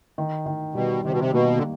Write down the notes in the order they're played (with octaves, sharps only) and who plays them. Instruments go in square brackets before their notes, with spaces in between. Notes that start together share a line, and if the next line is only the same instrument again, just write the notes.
[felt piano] D#3
D#3
[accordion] B2 [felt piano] G3
[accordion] C3 [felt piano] D#3
[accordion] B2
C3
[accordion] B2 [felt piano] A#3
[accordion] D3